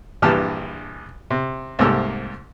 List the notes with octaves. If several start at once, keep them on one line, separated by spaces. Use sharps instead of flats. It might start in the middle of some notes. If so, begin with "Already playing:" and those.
A#1 G2 E3 G4 A5 F6
C3
C2 G#2 A3 A#3 G4 E6